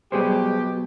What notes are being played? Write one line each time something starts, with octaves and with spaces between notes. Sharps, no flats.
B1 B2 G3 G4 G#4 C5